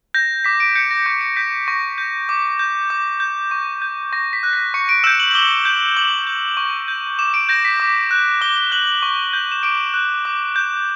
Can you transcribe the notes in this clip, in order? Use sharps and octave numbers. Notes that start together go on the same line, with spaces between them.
G6 A#6
D6 B6
D7
G6 C#7
A#6
C#6 G6
C#7
G6 B6
C#6 A#6
G6
D6
G6
D6
G6
C#6
G6
C#6 A#6
B6
F#6
A#6
C#6 C#7
D7
E6 G6 E7
F#7
F#7
D6 G7
G6
D6 F#7
G6
C#6
G6
D6 E7
D7
G6 A#6
B6
D6
F#6
D6 G7
G7
F#6 F#7
F#7
C#6
G6
E7
D6 D7
F#6
D6
G6